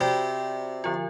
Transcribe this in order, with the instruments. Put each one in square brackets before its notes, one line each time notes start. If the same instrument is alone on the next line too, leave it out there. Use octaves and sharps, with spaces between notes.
[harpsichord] C3 [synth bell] F#4 D5 G5
[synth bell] D3 F3 F4